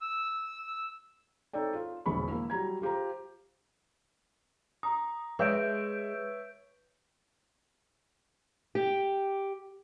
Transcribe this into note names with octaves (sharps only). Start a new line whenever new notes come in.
E6
C4 D#4 A4 C#5 D5 G5
F4
E1 A#1 D3 E3 B5 C#6
A#3 E4
F#3 G3 A#5 G#6
F4 G4 C5 A#5
A#5 D#6
G#3 B4 C#5 E5 G6 D7
G4